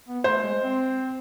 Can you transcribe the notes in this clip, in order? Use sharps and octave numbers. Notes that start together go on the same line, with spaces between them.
B3
A3 C5
G#3
C4